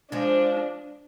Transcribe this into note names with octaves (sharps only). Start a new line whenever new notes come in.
F3 G#3 D4